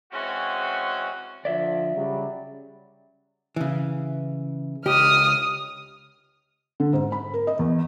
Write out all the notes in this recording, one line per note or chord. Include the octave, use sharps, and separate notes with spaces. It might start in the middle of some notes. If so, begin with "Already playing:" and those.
E3 G#3 C4 C#4 F#4
D3 F3 D5 E5
C#3 F#3 G3
C#3 E3
C#2 G4 D#6 F6
D3
G#2
B5
A#4
D#5
E2